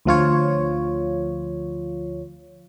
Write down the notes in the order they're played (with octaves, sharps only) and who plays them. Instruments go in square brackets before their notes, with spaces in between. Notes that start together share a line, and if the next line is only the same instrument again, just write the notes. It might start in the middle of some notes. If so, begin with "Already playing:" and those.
[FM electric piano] D2 F3 F4 C#5